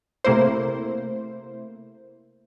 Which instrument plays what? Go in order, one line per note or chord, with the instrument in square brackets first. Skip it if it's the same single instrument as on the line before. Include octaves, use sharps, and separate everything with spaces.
[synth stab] C3 A3 A#3 E4 C5